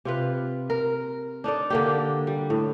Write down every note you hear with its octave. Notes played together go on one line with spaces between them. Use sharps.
C3 F4 B4
A#4
D4 D#4 A4 D5
D3 A#3 G4
G3
A2